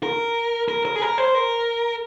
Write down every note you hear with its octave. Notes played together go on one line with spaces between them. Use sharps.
A#4
A#4
A#4
G#4
A#4
C5
A#4